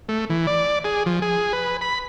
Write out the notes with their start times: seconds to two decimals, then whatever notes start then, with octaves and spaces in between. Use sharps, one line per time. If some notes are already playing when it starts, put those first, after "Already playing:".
0.09 A3
0.30 E3
0.47 D5
0.84 G#4
1.06 F3
1.22 G#4
1.53 B4
1.81 B5